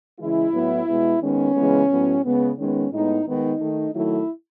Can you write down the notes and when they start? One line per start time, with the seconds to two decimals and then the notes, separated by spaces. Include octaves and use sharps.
0.19 C#3 E3 G#3 E4
0.53 A2 F#3 B3
0.87 B2 G#3 B3
1.21 D#3 G#3 B3 C#4
1.55 C#3 E3 G#3 B3
1.89 A2 F#3 B3
2.23 C#3 G#3 B3
2.58 D#3 G#3 B3 C#4
2.92 A2 G#3 B3 D#4
3.26 D#3 G#3 B3 D#4
3.60 D#3 A3
3.94 D#3 F#3 A3 E4